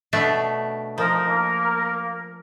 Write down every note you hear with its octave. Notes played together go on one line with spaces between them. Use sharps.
B2 A3 D4
F3 D#4 A#4
A#3